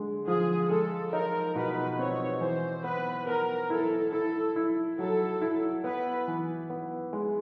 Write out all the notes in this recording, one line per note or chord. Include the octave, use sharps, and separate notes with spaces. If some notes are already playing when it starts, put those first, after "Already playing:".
Already playing: D3 G#3
F3 G#4
G#3 A4
D#4 A#4
B2 B4
C4 C#5
E3 C5
B3 B4
B3 A#4
E4 A4
E4 A4
E4
F#3 A4
E4
B3 B4
E3
B3
G#3